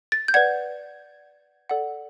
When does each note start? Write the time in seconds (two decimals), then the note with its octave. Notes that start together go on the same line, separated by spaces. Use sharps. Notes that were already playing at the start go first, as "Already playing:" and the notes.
0.12 A6
0.28 G6
0.34 B4 D5 F#5 G#6
1.69 A4 D5 F#5